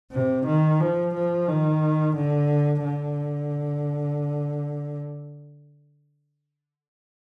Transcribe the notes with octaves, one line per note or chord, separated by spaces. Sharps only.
C3
D#3
F3
F3
D#3
D3
D3